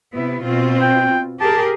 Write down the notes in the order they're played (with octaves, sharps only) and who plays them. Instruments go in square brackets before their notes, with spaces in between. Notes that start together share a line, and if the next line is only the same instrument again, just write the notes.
[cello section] C3 B3 E4
B2 C4 F4
[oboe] G5
[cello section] G4 G#4 A#4 [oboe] A5